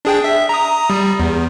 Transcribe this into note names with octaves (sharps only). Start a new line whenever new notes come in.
D4 G#4 G5
E5
A#5 D#6
G3
E2